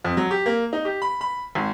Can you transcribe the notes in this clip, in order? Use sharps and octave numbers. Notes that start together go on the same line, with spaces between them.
F2
F#3
G4
A#3
D#4
G4
B5
B5
G#1